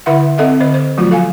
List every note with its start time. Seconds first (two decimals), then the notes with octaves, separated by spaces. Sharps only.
0.06 D3 E4 B4 E5 F#5
0.38 C4 A4 D#5 E5 F#5
0.60 D3 C5 D#5
0.74 C5
0.97 F3 F#3 A3 F4 F#4
1.11 A4 F5 G#5